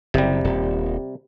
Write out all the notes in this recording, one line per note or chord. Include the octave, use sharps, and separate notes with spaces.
F#1 C3 G3
D#1